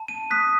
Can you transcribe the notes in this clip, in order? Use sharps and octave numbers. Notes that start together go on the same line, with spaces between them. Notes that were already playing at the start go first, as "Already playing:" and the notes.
Already playing: A5
D#7
D#6 F#6 B6